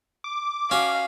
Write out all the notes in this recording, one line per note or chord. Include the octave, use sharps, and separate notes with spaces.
D6
C#4 F#4 F5